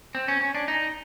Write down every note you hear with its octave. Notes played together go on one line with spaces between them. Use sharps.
C4
C#4
C#4
D4
D#4